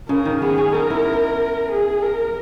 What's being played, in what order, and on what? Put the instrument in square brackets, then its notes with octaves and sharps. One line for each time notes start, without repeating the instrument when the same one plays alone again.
[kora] C#3 [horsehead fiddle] A#4
[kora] D#3
[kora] B3 [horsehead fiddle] G#4
[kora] C#4
[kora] D#4 [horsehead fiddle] A#4
[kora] E4
[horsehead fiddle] G#4
A#4